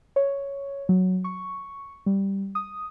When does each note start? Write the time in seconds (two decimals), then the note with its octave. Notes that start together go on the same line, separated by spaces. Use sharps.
0.16 C#5
0.89 F#3
1.24 C#6
2.06 G3
2.55 D#6